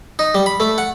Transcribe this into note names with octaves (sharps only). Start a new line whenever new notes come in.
D#4
G3
B5
A3
F#5